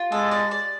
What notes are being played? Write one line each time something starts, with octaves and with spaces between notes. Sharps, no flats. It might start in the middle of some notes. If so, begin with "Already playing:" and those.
Already playing: F4
G#3 A4
D5
D5